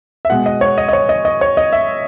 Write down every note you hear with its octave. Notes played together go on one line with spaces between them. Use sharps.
E5
B2 G#3 B3 F#5
D#5
C#5
D#5
D#5
C#5
D#5
D#5
C#5
D#5
E5